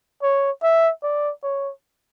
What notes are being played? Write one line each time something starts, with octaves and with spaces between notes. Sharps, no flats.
C#5
E5
D5
C#5